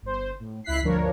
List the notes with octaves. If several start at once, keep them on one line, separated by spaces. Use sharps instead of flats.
G1 C5
A2
C#2 E4 F#6 B6 C7
G1 D2 F3 D4 A#4 C#5